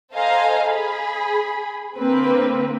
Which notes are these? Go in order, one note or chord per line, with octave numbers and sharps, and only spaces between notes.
A4 C5 D#5 F5 G#5 A#5
G#4 B5
D3 A#3 C4 B4